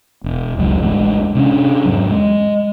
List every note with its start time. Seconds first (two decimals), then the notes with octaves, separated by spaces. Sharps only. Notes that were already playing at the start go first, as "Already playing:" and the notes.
0.24 E1
0.58 F1 C#2 F#3 G#3
0.83 A1 E2 G2 G#3
1.35 C3 C#4 D4
1.85 E2 G#2 F#3
2.11 G#3